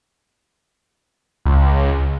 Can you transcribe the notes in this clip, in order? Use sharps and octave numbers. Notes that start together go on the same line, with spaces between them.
C#2